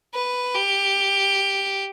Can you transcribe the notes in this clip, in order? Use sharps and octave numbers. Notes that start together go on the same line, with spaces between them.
B4
G4